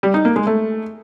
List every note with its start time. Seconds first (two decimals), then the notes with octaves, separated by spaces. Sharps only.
0.03 G3
0.14 D#4
0.25 A#3
0.36 G#3
0.47 A3